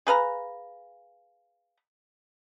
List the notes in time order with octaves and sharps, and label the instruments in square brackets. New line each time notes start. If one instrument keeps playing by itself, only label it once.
[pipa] G#4 B4 F5 A#5